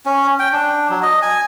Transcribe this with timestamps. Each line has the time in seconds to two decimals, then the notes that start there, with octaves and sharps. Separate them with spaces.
0.06 C#4
0.39 G5
0.53 D4
0.90 F#3
1.02 D#5
1.22 G#5